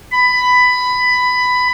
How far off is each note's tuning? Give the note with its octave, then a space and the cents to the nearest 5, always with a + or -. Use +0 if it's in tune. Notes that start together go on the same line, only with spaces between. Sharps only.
B5 +15